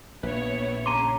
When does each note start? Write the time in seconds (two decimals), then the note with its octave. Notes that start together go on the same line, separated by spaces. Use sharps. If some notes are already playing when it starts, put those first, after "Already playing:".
0.23 A#1 B3 E4 B4 C#5
0.86 C#3 A5 A#5 C6 D6 D#7